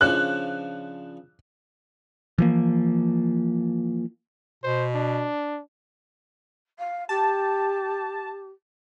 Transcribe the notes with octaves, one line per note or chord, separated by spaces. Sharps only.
C#3 F3 D4 F#6
E3 F3 A#3
B2 C5
D4
F5
G4 A5